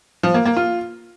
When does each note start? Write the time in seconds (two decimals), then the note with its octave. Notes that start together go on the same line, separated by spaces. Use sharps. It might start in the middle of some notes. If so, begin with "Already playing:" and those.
0.23 F3
0.34 A#3
0.45 A#3
0.57 F4